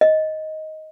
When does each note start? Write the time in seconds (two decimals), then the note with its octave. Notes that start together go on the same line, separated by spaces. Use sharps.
0.01 D#5